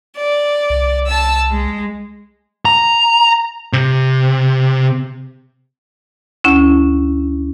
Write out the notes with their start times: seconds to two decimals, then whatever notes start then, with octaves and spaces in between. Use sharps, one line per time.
0.17 D5
0.70 C2
1.07 A5 E6
1.50 G#3
2.65 A#5
3.73 C3
6.44 D2 C#4 E4